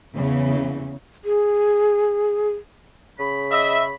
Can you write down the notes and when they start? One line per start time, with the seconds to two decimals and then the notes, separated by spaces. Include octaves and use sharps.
0.14 E2 C#3 E3
1.25 G#4
3.19 C#3 B5
3.51 D#5 E5